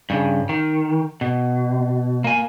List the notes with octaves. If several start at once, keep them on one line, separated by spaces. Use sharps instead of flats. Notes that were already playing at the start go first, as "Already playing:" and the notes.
G2 C#3
D#3
B2
A#3 G#5